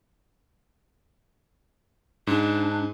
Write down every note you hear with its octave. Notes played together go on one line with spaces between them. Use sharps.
G#2 D4